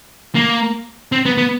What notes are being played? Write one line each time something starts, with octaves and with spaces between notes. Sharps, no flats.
A#3
C4
B3
B3